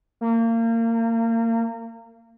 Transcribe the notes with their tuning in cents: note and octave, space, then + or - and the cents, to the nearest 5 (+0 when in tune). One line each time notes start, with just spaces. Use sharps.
A#3 -30